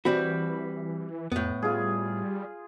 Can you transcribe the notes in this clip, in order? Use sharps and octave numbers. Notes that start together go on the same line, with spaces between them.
E3 G3 C4 F#4 B5
F2 A2 B3
G3 F4 G#4